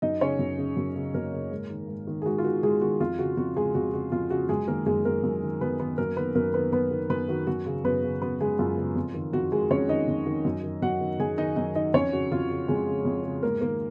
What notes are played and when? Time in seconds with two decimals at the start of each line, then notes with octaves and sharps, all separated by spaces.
0.02 F#2 D#4 D#5
0.21 C#3 C#4 C#5
0.39 F#2
0.58 C#3
0.77 F#2
0.95 C#3
1.14 F#2 A#3 A#4
1.33 C#3
1.52 G#2
1.70 D#3
1.88 G#2
2.07 D#3
2.22 G#4
2.26 G#2 F#4
2.38 F4
2.44 D#3 F#4
2.63 G#2 G#3 G#4
2.81 D#3 F#4
3.00 F2 F4
3.19 C#3 F#4
3.37 F2 F#4
3.56 C#3 G#3 G#4
3.75 F2 F#4
3.93 C#3 F#4
4.12 F2 F4
4.30 C#3 F#4
4.49 F#2 G#3 G#4
4.67 D#3 A#3 A#4
4.86 F#2 G#3 G#4
5.05 D#3 A#3 A#4
5.23 F#2
5.42 D#3
5.61 F#2 B3 B4
5.80 D#3 B3 B4
5.98 F#2 A#3 A#4
6.16 D#3 B3 B4
6.35 F#2 A#3 A#4
6.54 D#3 B3 B4
6.72 F#2 B3 B4
6.91 D#3
7.10 F#2 B3 B4
7.29 D#3 F#4
7.47 F#2 F#4
7.66 C#3
7.84 F#2 B3 B4
8.03 C#3
8.22 F#2 B3 B4
8.40 C#3 G#3 G#4
8.59 F#2 F4
8.78 C#3
8.96 F2
9.14 D#3
9.33 F2 F#4
9.52 D#3 G#3 G#4
9.71 F2 C#4 C#5
9.89 D#3 D#4 D#5
10.08 F2
10.26 D#3
10.45 F#2
10.63 D#3
10.82 F#2 F#4 F#5
11.00 D#3
11.20 F#2 G#4 G#5
11.38 D#3 D#4 D#5
11.56 F#2 D#4 D#5
11.75 D#3 D#4 D#5
11.94 F2 C#4 C#5
12.13 C#3 F#4
12.32 F2 F4
12.50 C#3
12.68 F2 G#3 G#4
12.87 C#3
13.05 F2
13.24 C#3
13.43 G#2 A#3 A#4
13.61 D#3 A#3 A#4